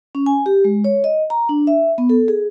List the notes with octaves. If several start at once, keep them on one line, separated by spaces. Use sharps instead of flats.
C#4
G#5
G4
G#3
C#5
D#5
A#5
D4
E5
B3
A4
G#4